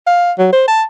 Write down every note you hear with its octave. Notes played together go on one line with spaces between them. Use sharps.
F5
F#3
C5
A5